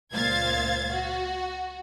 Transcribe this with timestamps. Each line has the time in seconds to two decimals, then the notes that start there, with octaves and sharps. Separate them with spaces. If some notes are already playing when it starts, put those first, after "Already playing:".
0.13 C#2 A#2 C5 F5 G#6 A6
0.92 F#4